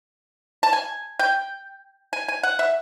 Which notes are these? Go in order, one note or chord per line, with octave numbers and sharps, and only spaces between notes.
A5
G#5
G5
G#5
G#5
F#5
E5